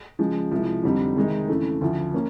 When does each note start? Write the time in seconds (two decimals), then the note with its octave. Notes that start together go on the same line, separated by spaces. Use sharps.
0.19 C#3 F3 G#3
0.51 C2 C3 F3 G#3
0.83 F2 D3 G3 C4 D#4
1.16 C3 D#3 G#3 C4 D#4
1.48 F2 C#3 E3 A3
1.81 D2 C#3 F3
2.14 A#3 C#4